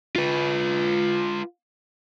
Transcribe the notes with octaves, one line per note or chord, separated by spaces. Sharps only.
F4 B4